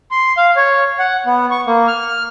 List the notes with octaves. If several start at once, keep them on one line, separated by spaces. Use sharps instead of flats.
C6
F5
C#5
F#5
B3
C#6
A#3
F6